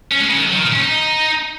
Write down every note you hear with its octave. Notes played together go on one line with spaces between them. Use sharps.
C#4
G#3
C#3
D#3
F#3
D#3
A#2
C#4
D#4